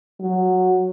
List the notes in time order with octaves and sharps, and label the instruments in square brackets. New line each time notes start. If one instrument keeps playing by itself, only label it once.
[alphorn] F#3